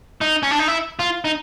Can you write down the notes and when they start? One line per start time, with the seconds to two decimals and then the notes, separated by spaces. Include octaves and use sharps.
0.21 D#4
0.43 C#4
0.51 D4
0.59 D#4
0.68 E4
0.99 F4
1.25 D#4